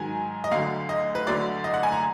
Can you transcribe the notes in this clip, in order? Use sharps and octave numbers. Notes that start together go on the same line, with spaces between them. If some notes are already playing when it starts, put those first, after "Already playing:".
Already playing: G#2 D#3 F#3 G#5
D#5
D2 D3 F#3 F5
D#5
B4
D2 D3 F#3 D5
D#5
F#5
G#5
A#5